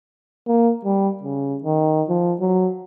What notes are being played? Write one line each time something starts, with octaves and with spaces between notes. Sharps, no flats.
A#3
G3
C#3
D#3
F3
F#3